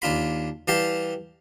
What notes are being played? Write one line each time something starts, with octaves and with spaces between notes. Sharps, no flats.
D#2 D4 F4 B5
E3 G3 G4 F5 A5